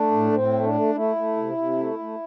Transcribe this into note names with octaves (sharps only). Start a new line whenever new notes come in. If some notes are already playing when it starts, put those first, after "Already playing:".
Already playing: A3 D4
A2
A2 C4
A3
D4
A3
A3 E4
A3
C3
C3
A3
A3